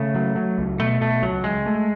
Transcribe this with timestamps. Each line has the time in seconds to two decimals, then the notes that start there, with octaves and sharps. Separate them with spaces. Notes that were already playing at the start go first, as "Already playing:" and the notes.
Already playing: C#3 A3
0.15 F#3
0.36 F#3
0.58 C#2
0.79 B2 A3
1.01 B2 A3
1.22 C#2 F#3
1.44 C#2 G#3
1.66 A3